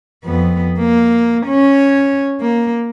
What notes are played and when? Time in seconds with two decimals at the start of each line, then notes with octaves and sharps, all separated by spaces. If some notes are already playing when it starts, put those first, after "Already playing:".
0.25 F2 B3
0.79 A#3
1.47 C#4 C#5
2.41 A#3